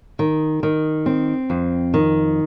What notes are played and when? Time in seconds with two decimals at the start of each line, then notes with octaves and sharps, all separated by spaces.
0.19 D#3
0.63 D#3
1.06 C4
1.50 F2
1.94 D#3